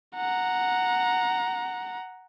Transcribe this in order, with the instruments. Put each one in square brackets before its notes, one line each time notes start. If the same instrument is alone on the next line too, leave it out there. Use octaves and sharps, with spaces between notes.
[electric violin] F#5 A#5